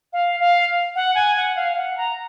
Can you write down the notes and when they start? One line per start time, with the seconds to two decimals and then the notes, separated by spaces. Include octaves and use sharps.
0.13 F5
0.40 F5
0.95 F#5
1.15 G#5
1.37 F#5
1.56 F5
1.72 F5
1.77 F#5
1.98 A#5